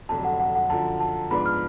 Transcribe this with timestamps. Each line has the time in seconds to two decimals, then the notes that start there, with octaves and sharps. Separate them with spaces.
0.09 F1 F2 D3 F#3 A5
0.24 F#5
0.40 F#5
0.55 F#5
0.70 F#2 D3 F3 A5
1.00 A5
1.31 G#2 F3 B3 D4 B5
1.46 F6